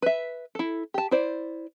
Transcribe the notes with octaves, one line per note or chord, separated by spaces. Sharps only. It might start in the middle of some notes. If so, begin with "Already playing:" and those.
B4 E5
E4 A4
G4 A5
E4 C5 D5